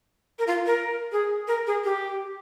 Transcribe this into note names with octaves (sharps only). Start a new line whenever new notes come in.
A#4
F4
A#4
G#4
A#4
G#4
G4